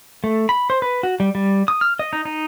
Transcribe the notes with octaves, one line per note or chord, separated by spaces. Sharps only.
A3
B5
C5
B4
F#4
G3
G3
D#6
F6
D#5
D#4
D#4